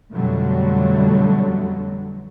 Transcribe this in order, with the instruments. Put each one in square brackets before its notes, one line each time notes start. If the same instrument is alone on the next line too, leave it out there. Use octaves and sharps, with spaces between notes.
[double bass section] F2 B2 D3 F#3 G3 A3